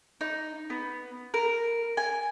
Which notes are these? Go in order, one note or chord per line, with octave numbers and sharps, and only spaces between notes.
D#4
B3
A#4
G#5